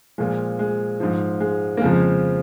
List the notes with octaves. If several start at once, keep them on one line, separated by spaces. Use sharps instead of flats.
A#2 F3 G#3
G#3
G#2 F3
G#3
A#3
F2 C#3 F3 G#3